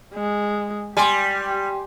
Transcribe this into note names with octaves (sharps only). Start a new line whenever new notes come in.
G#3
G3 G4 G#5 C6